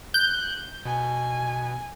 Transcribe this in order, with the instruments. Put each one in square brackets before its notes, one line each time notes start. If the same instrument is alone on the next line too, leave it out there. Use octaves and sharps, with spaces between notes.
[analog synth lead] F#6 [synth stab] G6
[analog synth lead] B2 [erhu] G#5